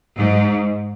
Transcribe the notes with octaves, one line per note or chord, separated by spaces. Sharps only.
G#2